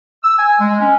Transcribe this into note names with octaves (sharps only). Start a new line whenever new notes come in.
E6
G#5
G#3
C#4